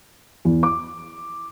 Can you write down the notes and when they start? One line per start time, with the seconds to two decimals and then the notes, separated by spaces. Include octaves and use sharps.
0.45 E2
0.63 D6